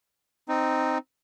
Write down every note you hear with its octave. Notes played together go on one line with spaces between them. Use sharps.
C4 D#4